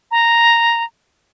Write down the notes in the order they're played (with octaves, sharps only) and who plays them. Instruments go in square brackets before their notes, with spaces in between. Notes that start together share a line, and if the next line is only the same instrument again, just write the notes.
[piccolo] A#5